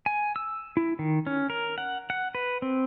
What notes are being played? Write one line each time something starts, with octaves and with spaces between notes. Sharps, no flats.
G#5
E6
E4
D#3
C#4
A#4
F#5
F#5
B4
C4